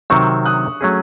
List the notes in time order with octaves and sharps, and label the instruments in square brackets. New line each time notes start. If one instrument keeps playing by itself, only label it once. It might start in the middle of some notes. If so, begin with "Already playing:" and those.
[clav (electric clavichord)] C3 D#3 F#3 C4 [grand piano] C#6 E6
[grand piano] D#6 F#6
[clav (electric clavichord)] F#3 A3 C#4 G#4